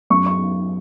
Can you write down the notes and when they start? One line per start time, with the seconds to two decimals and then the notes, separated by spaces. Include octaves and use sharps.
0.10 F#2 C#6
0.26 C#6